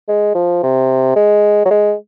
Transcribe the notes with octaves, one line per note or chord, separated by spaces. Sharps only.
G#3
F3
C3
G#3
F#3
G#3